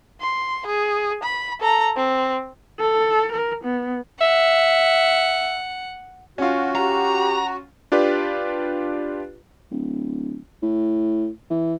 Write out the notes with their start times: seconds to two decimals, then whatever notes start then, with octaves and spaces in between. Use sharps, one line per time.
0.21 C6
0.66 G#4
1.23 B5
1.60 A4 A#5
1.96 C4
2.79 A4
3.32 A#4
3.64 B3
4.21 E5 F#5
6.38 C#4 F4 F#4
6.75 G4 A#5
7.92 D4 F4 G4 B4 D5
9.71 D1
10.62 A2
11.50 E3